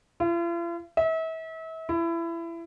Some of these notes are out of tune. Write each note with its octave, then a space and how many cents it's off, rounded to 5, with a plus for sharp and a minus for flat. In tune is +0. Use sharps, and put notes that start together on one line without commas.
F4 -45
E5 -35
E4 +25